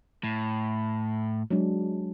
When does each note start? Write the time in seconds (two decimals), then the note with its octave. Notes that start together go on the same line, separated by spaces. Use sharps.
0.24 A2
1.51 F#3 G#3 D4